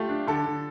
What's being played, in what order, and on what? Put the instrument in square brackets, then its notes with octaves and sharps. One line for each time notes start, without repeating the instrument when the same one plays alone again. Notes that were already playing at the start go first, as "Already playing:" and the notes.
Already playing: [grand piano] A3 [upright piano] F4 G4
[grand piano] D4
[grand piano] D3 [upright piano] A4
[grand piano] D3